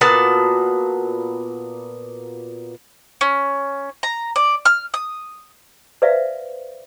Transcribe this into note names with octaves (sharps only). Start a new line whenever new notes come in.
A#2 B3 F#4 A5
C#4
A#5
D5
F6
D#6
B4 C5 D5 E5 F5